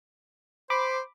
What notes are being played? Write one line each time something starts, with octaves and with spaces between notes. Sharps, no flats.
C5 B5 D6